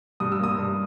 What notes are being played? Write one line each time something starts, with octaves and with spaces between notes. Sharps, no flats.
G2 D#6
E6
A#3 D#6
G2